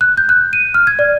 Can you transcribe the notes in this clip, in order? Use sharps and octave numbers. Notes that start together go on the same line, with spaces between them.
F#6
G6
F#6
D#7
F6
G#6
D5